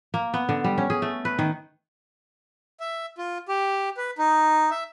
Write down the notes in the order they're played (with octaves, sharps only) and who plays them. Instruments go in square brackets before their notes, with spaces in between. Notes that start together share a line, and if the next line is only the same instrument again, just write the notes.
[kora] A#3
B3
D3
G3
C#4
G#4
A3
B4
D#3
[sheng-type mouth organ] E5
F4
G4
B4
D#4
E5